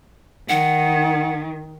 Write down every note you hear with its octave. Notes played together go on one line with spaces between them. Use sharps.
D#3 F#5